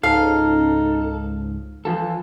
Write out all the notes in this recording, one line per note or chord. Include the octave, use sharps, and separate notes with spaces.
C#2 G#2 D#4 A4 F5
E3 F3 F4 A4